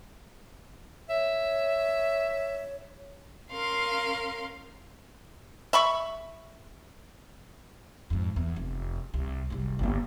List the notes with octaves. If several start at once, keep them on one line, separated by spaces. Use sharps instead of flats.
C#5 E5
C#4 A#4 F5 C6
E5 B5 C#6
F2 G#2
E2
F1
C2
F#1 C2
G1 A#3